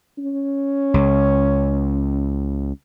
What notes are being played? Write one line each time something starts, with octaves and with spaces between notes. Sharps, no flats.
C#4
C#2